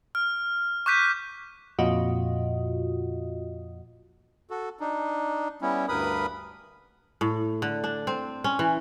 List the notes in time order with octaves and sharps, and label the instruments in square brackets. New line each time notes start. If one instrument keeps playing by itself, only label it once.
[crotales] F6
C#6 D6 F#6 G6 B6 D#7
[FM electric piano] F2 A#2 F4 F#4 D#5
[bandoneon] F#4 A4
D4 D#4
G3 B3 C#4 E4
D2 G2 A#4 B4 B5 D#6
[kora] A2
D3
D4
C4
C#4
E3